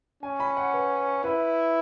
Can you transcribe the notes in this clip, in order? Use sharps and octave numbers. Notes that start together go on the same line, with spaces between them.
C#4 G#5
B5
F#5
B4
E4 B4